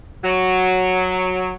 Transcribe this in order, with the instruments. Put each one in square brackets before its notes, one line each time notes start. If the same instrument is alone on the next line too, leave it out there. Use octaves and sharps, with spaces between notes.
[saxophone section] F#3